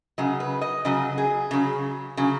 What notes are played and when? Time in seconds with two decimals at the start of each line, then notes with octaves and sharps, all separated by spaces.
0.18 C#3 F#3 D#5
0.40 B4
0.61 D#5
0.85 C#3 F#3 D#5
1.18 G#4
1.51 C#3 F#3
2.17 C#3 F#3